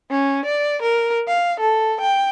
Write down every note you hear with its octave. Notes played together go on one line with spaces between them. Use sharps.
C#4
D5
A#4
F5
A4
G5